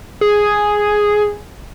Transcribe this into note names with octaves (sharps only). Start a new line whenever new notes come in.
G#4